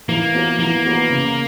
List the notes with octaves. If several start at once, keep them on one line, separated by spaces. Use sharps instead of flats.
E3 A#3
B3 F#4 B4
E3 A#3
B3 F#4 B4
C#3